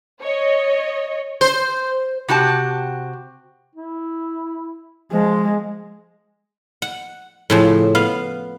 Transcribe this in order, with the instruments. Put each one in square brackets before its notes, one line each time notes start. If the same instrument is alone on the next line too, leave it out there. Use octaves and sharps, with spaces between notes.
[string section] C#5 D#5
[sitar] C5
[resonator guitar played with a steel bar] C3 F#4 G4 A5
[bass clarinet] E4
[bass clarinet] F3 [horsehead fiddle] G#3
[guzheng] F#5
A2 C#3 F3
B3 F5